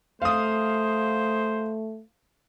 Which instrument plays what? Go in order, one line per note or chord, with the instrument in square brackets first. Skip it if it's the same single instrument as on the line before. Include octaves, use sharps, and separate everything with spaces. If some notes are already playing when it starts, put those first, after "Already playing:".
[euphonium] A3 [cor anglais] C5 [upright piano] F5 D#6